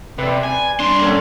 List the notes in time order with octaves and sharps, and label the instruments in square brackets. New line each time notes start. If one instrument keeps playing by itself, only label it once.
[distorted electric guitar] C3 [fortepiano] B4 D5
[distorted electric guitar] G#5
[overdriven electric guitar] G2 C6 [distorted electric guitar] D4
[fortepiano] A#3 C#4 A4